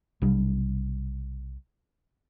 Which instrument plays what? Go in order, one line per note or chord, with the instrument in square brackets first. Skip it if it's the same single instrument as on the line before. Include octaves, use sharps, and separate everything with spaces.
[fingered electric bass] B1 C3 G3 D4